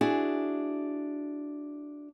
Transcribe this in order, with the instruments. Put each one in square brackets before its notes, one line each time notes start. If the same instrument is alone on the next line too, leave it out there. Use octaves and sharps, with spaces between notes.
[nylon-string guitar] D4 E4 F#4 G#4